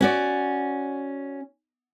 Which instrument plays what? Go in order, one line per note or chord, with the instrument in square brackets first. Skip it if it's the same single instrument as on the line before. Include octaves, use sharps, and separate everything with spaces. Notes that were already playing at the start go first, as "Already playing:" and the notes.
[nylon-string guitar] C#4 F#4 D5